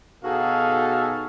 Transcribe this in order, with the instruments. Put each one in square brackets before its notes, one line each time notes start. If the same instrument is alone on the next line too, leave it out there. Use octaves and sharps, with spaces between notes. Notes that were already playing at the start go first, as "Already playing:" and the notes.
[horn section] B2 D#4 F#4 G#4 A4 F5